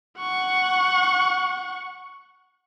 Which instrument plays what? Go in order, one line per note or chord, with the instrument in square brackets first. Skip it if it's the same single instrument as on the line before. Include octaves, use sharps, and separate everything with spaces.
[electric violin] F#5 C#6